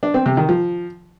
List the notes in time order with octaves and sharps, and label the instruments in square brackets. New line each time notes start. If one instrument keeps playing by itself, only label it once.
[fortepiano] D4
C4
C3
D#3
F3